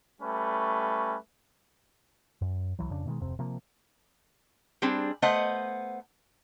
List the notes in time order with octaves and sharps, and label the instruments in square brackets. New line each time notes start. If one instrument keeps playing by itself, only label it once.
[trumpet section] G3 A3 C#4 B4
[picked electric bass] F#2
C2 E3 F#3
F2 C#3 D4
B2 D#3 G#3
D1 F2 C3 C4
C3 F3 A#3
[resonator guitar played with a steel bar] G3 C4 D4 G#4
A3 B3 C5 D#5 F#5